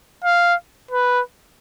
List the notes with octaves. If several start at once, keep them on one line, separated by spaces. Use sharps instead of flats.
F5
B4